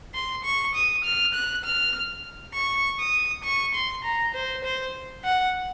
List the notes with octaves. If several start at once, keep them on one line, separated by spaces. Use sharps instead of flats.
C6
C#6
D#6
F6
F#6
F6
C#6
D#6
C#6
C6
A#5
C5
C5
F#5